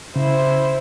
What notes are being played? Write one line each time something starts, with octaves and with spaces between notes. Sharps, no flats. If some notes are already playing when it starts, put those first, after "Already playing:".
C#3 E4 C5